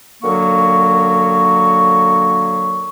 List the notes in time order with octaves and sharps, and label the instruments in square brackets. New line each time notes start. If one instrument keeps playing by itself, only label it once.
[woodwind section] F#2 D3 F#3 A#3 C#6